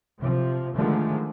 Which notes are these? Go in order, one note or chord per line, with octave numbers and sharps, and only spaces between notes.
C3 F3
D3 D#3 F3 G#3 A3